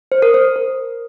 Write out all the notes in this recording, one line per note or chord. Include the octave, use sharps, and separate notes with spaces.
C5
A#4
C5
A#4